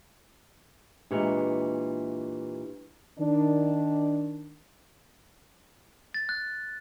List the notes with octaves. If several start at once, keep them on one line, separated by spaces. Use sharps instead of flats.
A#2 E3 G#3 D4 G4 B4
D#3 D4
A6
F#6